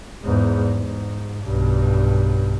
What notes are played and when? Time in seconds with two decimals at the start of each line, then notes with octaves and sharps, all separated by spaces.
0.24 E2 G#2
0.78 G#2
1.44 B1 G2